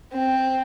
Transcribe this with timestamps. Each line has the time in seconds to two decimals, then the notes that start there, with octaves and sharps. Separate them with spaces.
0.13 C4